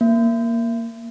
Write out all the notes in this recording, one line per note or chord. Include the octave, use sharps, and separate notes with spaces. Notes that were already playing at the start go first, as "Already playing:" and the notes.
A#3